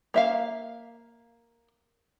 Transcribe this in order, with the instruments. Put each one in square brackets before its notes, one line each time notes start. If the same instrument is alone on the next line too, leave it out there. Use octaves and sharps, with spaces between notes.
[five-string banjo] A#3 E5 F5